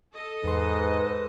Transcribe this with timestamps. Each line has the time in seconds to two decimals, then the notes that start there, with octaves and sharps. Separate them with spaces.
0.15 A4 D#5
0.44 E2 G#2 B4 C6